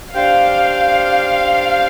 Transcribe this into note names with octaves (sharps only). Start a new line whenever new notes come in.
D4 G4 C5 F5 G5